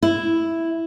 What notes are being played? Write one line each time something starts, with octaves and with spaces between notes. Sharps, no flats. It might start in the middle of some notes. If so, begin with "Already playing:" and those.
E4